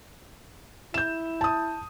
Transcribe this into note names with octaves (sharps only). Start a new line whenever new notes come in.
E4 G6 E7
A5 D#6